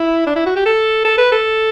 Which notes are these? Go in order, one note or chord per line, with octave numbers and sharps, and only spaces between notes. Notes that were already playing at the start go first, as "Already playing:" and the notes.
Already playing: E4
D4
E4
F#4
G4
A4
A4
B4
A4